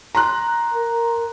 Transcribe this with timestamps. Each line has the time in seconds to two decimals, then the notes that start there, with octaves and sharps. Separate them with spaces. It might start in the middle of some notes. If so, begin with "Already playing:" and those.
0.15 A#5 C6 F#6
0.74 A#4